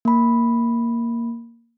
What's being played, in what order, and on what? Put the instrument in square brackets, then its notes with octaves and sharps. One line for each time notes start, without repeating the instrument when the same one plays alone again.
[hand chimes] A#3 B5